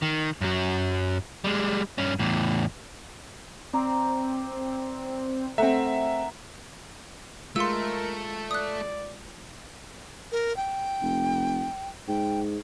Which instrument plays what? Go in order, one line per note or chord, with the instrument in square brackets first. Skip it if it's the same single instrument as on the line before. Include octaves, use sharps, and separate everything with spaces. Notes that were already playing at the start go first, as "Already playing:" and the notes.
[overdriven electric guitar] D#3
F#2 F#3
G3 G#3
G2 C#4
E2 A2
[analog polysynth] C4 [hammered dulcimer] D5 A#5
[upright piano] A3 C4 [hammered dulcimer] A#4 F#5 A#5 [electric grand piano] E5
[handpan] G#3 F4 [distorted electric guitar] A3 [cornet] A#4 [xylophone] C6 E6
[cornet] D5 [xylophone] D#6 F#6
[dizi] A#4
G5
[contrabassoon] F1
[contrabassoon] G#2 [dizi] G5